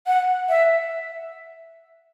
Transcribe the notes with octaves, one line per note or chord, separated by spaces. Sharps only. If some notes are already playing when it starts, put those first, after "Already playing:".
F#5
E5